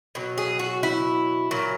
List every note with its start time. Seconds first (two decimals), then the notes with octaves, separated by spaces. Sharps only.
0.15 B2 F#3
0.38 G#4
0.59 F#4
0.83 E4
1.51 A#2 F#3